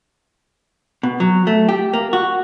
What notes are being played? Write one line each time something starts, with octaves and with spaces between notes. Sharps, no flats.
B2
F#3
A3
G4
A#3
F#4